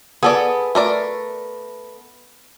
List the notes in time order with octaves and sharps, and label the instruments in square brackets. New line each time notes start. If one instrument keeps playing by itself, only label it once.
[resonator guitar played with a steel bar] B3 [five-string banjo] G#4 A4 D5
[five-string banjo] A3 A#4 D5